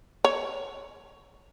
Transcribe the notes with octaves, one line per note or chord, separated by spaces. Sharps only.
C#5